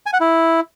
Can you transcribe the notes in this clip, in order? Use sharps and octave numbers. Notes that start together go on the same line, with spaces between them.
G#5
F#5
E4